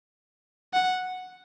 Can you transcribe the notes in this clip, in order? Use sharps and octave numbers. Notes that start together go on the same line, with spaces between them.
F#5